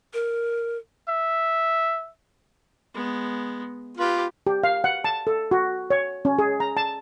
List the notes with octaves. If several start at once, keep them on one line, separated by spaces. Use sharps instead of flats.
A#4
E5
G#3 B3
F4 G4 B4
G4
F5
F#5
A5
A4
F#4
C#5
C#4
G#4
A#5
A5